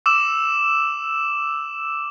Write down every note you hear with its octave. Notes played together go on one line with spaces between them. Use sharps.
D6 E6 E7